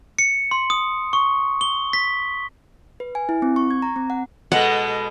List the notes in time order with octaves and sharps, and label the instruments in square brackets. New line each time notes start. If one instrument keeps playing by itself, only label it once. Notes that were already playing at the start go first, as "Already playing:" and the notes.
[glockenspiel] C#7
C6
D#6
C#6
G7
B6
[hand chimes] B4
G#5
E4
C4
C#6
G#6
A#5
C4
F#5
[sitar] B2 G#3 B3 [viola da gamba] A4 [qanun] F#5